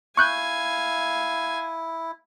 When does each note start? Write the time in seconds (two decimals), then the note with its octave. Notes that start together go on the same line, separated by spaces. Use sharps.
0.17 E4 F5 G#5 C#6 F#6 G6